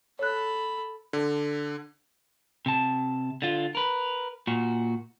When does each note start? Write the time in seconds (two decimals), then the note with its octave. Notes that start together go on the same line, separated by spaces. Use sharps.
0.19 A4 C#5 B5 F#6
1.13 D3
2.66 C3 A5
3.42 D3 F4
3.75 A#4 B4
4.47 A#2 F#4